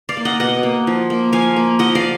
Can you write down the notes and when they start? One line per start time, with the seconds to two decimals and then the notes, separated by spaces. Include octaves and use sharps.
0.09 D5 F5
0.17 A#3
0.25 D#5 F#5
0.40 B2 D#5 F#5
0.63 A#3
0.87 F3
1.10 A#3
1.32 F3 F5 G#5
1.56 A#3
1.79 F3 D#5 F#5
1.95 D5 F5